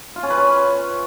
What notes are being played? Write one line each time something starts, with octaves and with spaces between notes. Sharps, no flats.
F4
C#4
B4
C#4